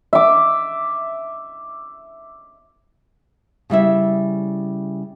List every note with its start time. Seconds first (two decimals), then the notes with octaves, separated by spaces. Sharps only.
0.13 E5 D6
3.70 C#3 G3 E4 E5